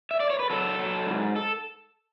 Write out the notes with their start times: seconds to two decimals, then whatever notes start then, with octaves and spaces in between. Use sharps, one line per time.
0.11 E5
0.20 D5
0.30 C#5
0.39 B4
0.50 F#3 A4
0.79 F#3
1.07 G#2
1.36 A4